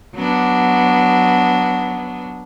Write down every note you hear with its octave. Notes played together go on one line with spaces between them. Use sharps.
F#3 B3 D4